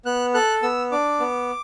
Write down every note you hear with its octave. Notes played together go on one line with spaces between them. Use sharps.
B3 F#6
A4 F#6
B3 E6
D4 D6
B3